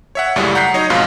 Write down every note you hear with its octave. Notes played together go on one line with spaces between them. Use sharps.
C#5 E5 F#5
C#2 F#2 A2 C#3 G3 A3
F#5 A#5 G6 B6 C7
F#3 D#4 C#5 D#5
F2 G#2 B2 F4 B4 F5